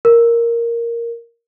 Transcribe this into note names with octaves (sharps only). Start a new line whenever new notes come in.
A#4